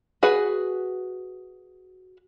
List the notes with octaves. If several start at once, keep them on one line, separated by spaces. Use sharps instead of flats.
F#4 G#4 B4 F#5